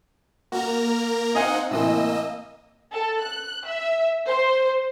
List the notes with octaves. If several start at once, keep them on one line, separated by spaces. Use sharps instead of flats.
A#3 F#4 A#4 A#5
C4 D#4 D#5 F5 F#5 G#5
A2 C3 E3 A#3 D#5 E6
A4
F#6
E5
C5